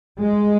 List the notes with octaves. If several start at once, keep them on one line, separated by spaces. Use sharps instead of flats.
G#3